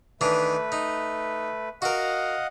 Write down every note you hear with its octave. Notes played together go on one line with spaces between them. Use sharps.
D#3 E3 A3 D4 B4
D#4
F#4 A#4 D#5 F5 F#5